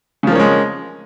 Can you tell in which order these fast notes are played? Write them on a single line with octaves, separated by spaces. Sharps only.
C#3 F3 A#3 C#4 G#3